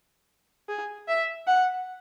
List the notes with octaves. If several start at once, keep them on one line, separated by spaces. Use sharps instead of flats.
G#4
E5
F#5